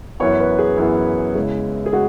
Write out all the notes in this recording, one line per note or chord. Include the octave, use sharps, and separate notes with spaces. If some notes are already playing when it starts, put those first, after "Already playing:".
F#2 E3 B3 C#5
B4
G#4
F#2 E3 B3 E4
E2 C#3 G#3
G#4
G#3 F#4